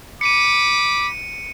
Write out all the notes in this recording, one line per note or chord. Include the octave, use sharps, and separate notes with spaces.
B5 D6 C#7 D#7